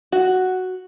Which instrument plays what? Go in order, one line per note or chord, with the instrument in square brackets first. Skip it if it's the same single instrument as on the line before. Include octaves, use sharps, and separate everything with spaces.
[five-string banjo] F#4